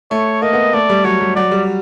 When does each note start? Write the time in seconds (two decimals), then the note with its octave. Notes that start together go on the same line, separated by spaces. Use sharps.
0.11 A3 C#5
0.42 A#3 D#5
0.53 B3
0.73 A3 D5
0.89 G3
1.04 F#3 C#5
1.20 G3
1.36 F#3 D5
1.52 G3